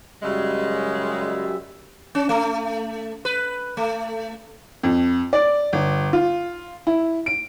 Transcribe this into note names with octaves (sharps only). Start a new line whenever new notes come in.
F#2 C#3 G3 G#3 E5
C#4
A3
B4
A3
F2
D5
G1
F4
E4
D7